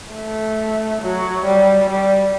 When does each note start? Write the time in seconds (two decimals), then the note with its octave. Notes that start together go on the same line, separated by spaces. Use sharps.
0.14 A3
1.02 F#3
1.45 G3
1.90 G3